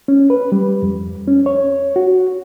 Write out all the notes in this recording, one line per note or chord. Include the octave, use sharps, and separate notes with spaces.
C#4
B4
G3
F2
C#4
C#5
F#4